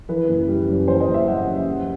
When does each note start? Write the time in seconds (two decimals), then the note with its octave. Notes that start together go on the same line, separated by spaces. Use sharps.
0.09 E3 B4
0.28 F#1
0.48 G3
0.68 F#2
0.88 E3 C5
1.00 D#5
1.07 F#1
1.14 E5
1.27 G3 F#5
1.46 F#2
1.66 G3